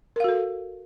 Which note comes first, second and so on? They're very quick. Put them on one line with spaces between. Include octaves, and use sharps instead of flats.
A#4 F5 F#4 A4